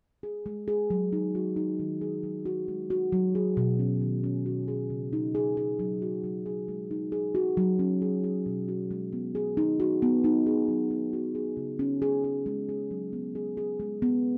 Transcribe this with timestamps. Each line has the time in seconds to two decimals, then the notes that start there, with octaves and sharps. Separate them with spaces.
0.23 G#4
0.46 G#3
0.68 G#4
0.90 F#3
1.13 D#4
1.35 F#4
1.56 D#4
1.79 D#3
2.01 G#4
2.24 F#3
2.45 F#4
2.68 G#3
2.90 F#4
3.12 F#3
3.35 G#4
3.57 B2
3.79 C#4
4.01 D#3
4.24 C#4
4.46 F#4
4.68 G#4
4.90 C#3
5.13 D#4
5.35 G#4
5.57 G#4
5.79 F#3
6.02 F#4
6.24 F#3
6.46 G#4
6.68 G#3
6.91 D#4
7.12 G#4
7.35 F#4
7.57 F#3
7.79 C#4
8.02 G#4
8.24 G#4
8.46 B2
8.68 F#4
8.91 G#3
9.13 B3
9.35 G#4
9.57 D#4
9.80 F#4
10.02 B3
10.24 D#4
10.46 G#4
10.68 F#3
10.91 D#4
11.13 F#4
11.35 G#4
11.57 C#3
11.79 C#4
12.02 G#4
12.24 G#4
12.46 G#3
12.69 G#4
12.91 F#3
13.13 B3
13.35 G#4
13.57 G#4
13.80 G#3
14.02 B3